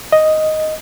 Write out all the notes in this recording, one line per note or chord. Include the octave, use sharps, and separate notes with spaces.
D#5